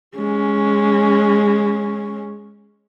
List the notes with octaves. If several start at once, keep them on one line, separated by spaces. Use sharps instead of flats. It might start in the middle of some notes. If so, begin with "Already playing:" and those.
G#3 C#4